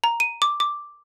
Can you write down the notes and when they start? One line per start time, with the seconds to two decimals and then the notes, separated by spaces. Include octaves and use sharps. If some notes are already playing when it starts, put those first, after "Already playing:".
0.04 A#5
0.20 D#7
0.42 D6
0.60 D6